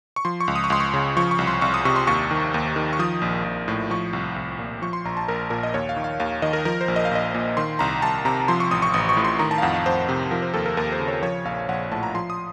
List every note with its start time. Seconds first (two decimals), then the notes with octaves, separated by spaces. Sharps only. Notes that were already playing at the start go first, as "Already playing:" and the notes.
0.16 C#6
0.25 F3 C6
0.40 C#6
0.48 C#2
0.55 D#6
0.64 C#6
0.70 C#2 C6
0.80 C#6
0.94 C#3
1.17 F3 C#6
1.31 C#6
1.39 C2
1.47 C6
1.61 C2 C#6
1.74 D#6
1.85 C3 C#6
1.96 C6
2.07 D#2 C#6
2.31 D#3
2.54 D#2
2.76 D#3
2.93 C#6
2.99 F3 D#6
3.22 A#1
3.44 A#1
3.68 A2
3.90 F3 C#6
4.13 C2
4.36 C2
4.59 A#2
4.82 F3 C#6
4.93 C6
5.05 A#1 A#5
5.17 A5
5.28 A#1 A#4
5.50 A#2 A#4
5.63 D#5
5.74 D#2 C#5
5.89 F5
5.97 D#3
6.04 F5
6.20 D#2 F5
6.42 D#3 D#5
6.53 A#4
6.65 F3 A#4
6.81 C5
6.88 A#1
6.96 D#5
7.05 F5
7.11 A#1 D#5
7.34 A#2
7.57 D#3 C6
7.79 C2 A#5
8.02 C2 A5
8.25 C3 A#5
8.48 F3 C6
8.60 C#6
8.71 A1 D#6
8.82 C#6
8.94 A1 D#6
9.09 C#6
9.17 A2
9.25 C6
9.39 D#3 A#5
9.51 A5
9.58 F5
9.62 F2 F#5
9.74 F5
9.86 F2 C5
10.09 C3
10.31 F3 A#4
10.42 C5
10.54 D#2 A4
10.66 A#4
10.77 D#2 A#4
10.92 C5
11.00 C#3
11.08 C#5
11.23 F3 C#5
11.45 A#1 F5
11.69 A#1 F#5
11.92 A2 A5
12.03 A#5
12.14 F3 C6
12.30 D#6